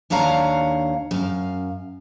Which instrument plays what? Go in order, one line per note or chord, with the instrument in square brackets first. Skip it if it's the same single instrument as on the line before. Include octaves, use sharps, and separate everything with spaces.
[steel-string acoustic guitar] D#2 D4 C#5 F5 A#5
F#2 F5